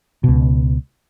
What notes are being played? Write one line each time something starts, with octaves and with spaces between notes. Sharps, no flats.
C#2 B2